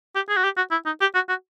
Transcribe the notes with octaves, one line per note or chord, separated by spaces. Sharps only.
G4
G#4
F#4
G4
F#4
E4
D#4
G4
F#4
F#4